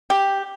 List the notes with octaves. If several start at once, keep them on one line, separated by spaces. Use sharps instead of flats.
G4